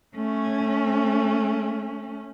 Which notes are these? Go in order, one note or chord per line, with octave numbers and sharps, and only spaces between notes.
A3 C#4